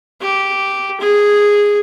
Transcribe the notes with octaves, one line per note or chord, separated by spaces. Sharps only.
G4
G#4